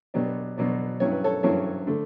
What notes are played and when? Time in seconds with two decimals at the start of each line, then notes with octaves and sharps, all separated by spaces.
0.14 B2 F#3 B3 D4 G4
0.57 B2 F#3 B3 D4
1.00 G2 F#3 C#4 E4 C#5
1.12 B4
1.24 A4 C#5
1.43 G2 F#3 C#4 E4 A4 C#5
1.87 D3 A3